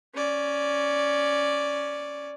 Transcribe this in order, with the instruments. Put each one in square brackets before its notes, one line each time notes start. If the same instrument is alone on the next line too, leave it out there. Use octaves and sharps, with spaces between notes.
[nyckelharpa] C#4 D5